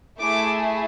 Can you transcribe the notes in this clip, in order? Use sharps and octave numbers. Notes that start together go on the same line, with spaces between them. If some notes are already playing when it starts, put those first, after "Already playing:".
A3 E4 G#4 D6